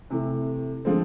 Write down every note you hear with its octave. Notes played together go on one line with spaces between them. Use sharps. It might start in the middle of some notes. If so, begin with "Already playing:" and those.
C3 E3 A3
D3 F3 G#3 C4